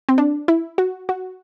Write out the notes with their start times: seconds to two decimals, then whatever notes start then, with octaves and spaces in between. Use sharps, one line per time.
0.09 C4
0.18 D4
0.48 E4
0.78 F#4
1.09 F#4